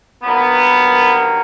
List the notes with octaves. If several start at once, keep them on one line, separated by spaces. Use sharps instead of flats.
G2 D#3 F#3 A#3 B3